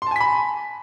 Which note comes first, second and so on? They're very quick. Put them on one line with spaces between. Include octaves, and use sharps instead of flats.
C6 A5 G#5 B6 B5